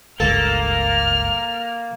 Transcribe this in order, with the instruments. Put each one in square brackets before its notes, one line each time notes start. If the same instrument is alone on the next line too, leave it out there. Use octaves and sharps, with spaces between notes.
[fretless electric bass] F#1 C#2 G2 [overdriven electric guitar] A#3 [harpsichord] A4 A5 [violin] F6